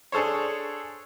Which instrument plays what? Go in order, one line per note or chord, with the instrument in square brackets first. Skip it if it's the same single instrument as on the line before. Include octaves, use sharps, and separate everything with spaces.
[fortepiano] D4 G#4 A4 C5 C#5